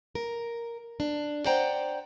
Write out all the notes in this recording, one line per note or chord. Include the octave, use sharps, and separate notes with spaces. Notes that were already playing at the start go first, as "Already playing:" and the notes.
A#4
D4
C5 D5 F#5 G5 A#5